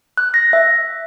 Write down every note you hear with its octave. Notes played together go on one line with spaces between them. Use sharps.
F#6
A#6
E5